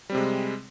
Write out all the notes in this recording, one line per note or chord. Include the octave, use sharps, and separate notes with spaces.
C3 G3 G#3 C4